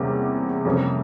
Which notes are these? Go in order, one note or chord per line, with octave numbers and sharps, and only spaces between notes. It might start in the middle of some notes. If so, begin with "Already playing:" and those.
Already playing: E2 C3 G3 A#3 C#4
F2 C3 G3 A#3 C#4